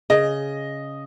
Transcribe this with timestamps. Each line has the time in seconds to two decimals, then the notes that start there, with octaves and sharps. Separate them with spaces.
0.10 C#3 D#5